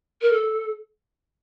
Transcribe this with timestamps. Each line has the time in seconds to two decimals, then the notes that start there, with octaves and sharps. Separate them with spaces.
0.22 A#4
0.33 A4